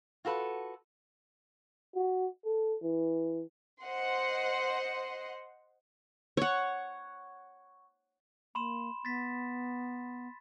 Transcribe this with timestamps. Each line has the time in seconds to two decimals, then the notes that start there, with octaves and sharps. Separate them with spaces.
0.25 F4 F#4 A4 B4
1.96 F#4
2.45 A4
2.82 E3
3.82 C5 D#5 F#5 C6
6.37 C#5 F#5
8.55 A#3 B5 C6 E7
9.05 B3 A6 B6